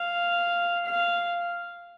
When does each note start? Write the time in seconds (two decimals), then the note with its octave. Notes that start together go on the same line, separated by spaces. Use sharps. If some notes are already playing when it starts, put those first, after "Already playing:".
Already playing: F5
0.86 F5